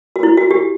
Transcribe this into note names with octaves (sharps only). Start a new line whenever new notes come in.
F#4
E4
F#4
G4